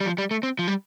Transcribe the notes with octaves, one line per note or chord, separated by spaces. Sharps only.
G3
F3
G3
A3
C4
F3
G3